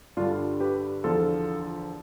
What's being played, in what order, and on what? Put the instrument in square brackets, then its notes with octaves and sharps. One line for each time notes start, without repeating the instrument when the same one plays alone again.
[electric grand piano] G2 D3 G3 D4 F4
G4 B4
E2 D3 F3 F4 A4